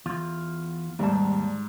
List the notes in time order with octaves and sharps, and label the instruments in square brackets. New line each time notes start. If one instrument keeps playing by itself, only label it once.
[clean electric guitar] E2 F4
[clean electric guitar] D#2 A5 [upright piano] G#2 [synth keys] G3